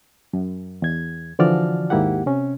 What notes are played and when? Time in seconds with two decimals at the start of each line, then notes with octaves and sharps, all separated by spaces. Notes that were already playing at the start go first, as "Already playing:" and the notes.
0.33 F#2
0.82 E2 G#6
1.39 D3 E3 F3 F#4 D5 F6
1.90 D#2 G#2 A#3 E4 G4 F#5
2.26 C3 C#4